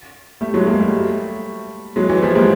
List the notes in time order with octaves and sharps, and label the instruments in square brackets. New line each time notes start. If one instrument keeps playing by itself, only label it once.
[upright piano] G3 A3
F#3 G#3
G#3 A#3
G3 A3
F#3 G#3
E3 F#3
F3 G3
G#3 A#3